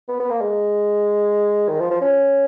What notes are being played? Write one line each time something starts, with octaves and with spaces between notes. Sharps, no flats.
B3
B3
A#3
G#3
D#3
F3
F3
C#4